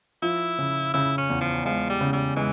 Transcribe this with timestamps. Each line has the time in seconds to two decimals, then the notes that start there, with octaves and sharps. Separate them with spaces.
0.22 F3 E4
0.59 C#3
0.94 C#3 E4
1.18 C#4
1.30 E2
1.41 F3
1.65 F3 G#3
1.90 G3
2.01 C#3
2.13 G3
2.36 E3 G#3